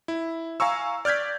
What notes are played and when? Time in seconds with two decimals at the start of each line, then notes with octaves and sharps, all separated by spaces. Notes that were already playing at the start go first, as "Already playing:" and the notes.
0.08 E4
0.60 F5 G#5 A#5 C#6 E6
1.05 D5 F6 G6 G#6 B6